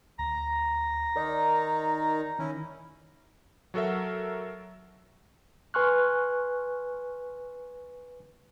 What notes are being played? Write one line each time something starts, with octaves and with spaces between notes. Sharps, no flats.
D2 A#5
D#3 D#4 A#4 D5 D#5
D#3 C#4 E4
F#3 F#4 A4 A#4 E5
B4 G#5 C6 C#6 F6 F#6